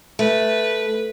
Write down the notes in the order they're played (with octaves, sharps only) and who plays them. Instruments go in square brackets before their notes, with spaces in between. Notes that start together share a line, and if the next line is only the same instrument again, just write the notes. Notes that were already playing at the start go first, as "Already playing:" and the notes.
[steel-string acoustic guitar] A3 [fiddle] B4